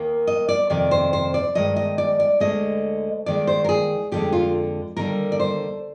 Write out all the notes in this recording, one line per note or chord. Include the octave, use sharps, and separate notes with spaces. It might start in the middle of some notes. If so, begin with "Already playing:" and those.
Already playing: D#2 D#3 A#3
D#5
D5
F2 C3 D#3 D5
C5
C5
D5
G2 D#3 G#3 D#5
D#5
D5
D5
D2 D3 G#3 D#5
D#2 D#3 G#3 D5
C5
A#4
G#4
F2 D3 G#3 G4
F4
D#2 D3 G3 A#4
D5
C5